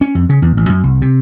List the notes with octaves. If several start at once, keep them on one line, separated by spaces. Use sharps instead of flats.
C#4
F2
C#3
E2
A1
F#2
C2
C3